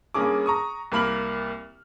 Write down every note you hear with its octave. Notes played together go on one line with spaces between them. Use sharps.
G2 A#3 C#4 G#4 D6
A#5 C#6 D#6
C2 A#3 B5 F6 F#7